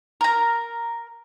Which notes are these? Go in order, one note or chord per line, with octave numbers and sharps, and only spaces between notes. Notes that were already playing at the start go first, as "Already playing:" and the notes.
A#4 A#5